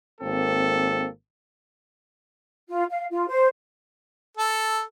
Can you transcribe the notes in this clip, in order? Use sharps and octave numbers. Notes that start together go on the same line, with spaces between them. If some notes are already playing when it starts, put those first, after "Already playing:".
G#1 A#3 C4 A4
F4
F5
F4
C5
A4